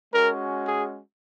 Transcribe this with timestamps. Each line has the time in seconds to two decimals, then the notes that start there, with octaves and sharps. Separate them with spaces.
0.12 G#3 C#4 F#4 A#4
0.68 G#4